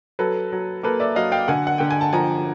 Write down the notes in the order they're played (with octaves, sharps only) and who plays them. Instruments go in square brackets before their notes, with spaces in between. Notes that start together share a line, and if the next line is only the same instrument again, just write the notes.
[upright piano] F#3 A4 B4
F#3
A#3 A4 B4
D5 E5
F#3 D#5 F5
F5 G5
D3 F#5 G#5
F#5
D3 G5
G#5
A5
F3 G#5 A#5